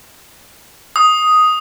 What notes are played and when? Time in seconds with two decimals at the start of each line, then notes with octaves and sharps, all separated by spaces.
0.96 D#6